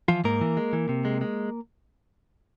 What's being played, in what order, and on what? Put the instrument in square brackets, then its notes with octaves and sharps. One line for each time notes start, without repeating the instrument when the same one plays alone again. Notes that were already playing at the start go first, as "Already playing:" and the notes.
[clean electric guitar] E3 F3 F4
G#2 A#3 A#4
E3
G#3
E3
C3
G#3
G#3